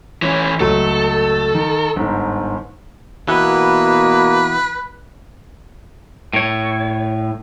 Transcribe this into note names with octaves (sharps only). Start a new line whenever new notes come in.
E3 C#4
C#2 F#3 A3 A4
D#3
G1 G#2
B2 E3 A#3 B3 B4
A2 C#5